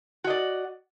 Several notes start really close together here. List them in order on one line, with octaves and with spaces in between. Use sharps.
F#4 D#5 D5